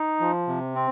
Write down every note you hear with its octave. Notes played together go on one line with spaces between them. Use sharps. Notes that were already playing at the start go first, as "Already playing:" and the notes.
Already playing: D#4
F3
C3
C4